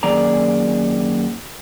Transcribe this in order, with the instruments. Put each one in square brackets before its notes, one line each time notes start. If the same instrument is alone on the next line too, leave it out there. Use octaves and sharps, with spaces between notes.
[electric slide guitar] F#2 D#3 A#3 G#4 D5 A#5